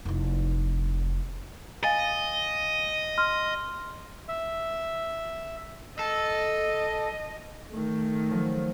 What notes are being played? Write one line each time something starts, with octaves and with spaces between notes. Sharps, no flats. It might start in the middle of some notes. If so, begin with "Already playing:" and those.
F1 E4
D#5 F5 G#5 A6
C6 F6
E5
A4 D#5
D#3 A3
F3 F#3